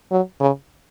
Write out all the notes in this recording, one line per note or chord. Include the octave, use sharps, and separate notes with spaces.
F#3
C#3